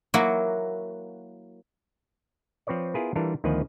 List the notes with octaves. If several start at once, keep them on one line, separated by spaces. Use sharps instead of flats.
F#3 A#3 E4 F#4
F3 C4 B4 C#5 D5
B3 E4 F4 G#4 A#4 B4
E3 G3 D4 F4 A4 A#4
D2 D#3 F3 B3 B4 G#5